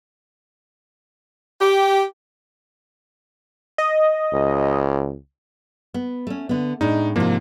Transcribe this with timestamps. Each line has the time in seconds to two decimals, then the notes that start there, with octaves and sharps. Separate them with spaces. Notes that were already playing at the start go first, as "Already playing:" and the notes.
1.61 G4
3.78 D#5
4.33 C#2
5.94 B3
6.27 A3 C#4
6.49 D3 B3
6.81 A2 G#3 D4 D#4
7.16 G#2 C3 F3 A#3